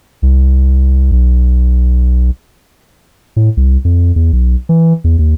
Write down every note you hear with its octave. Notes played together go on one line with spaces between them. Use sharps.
C2
B1
A2
C2
F2
E2
B1
E3
E2
D#2